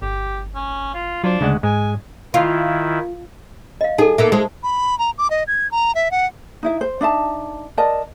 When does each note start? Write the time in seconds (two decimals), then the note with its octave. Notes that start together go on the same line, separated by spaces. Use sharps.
0.02 G1 G4
0.55 C#4
0.94 F4
1.24 F#3 D4 F4 C5
1.41 D2 C#3 G#3 F#5
1.63 G#2 G#3 G#5
2.34 D#3 E4 F4
3.81 D#5 F5
3.98 D#4 G#4 A4
4.18 A#3 B3 A4 E5
4.32 G#3 G#4 C5
4.63 B5
4.99 A#5
5.18 D6
5.30 D#5
5.48 G#6
5.71 A#5
5.95 E5
6.11 F#5
6.63 D#4 E4 E5
6.81 C5
7.01 D4 D#4 E5 A5
7.77 A#4 D5 D#5 A5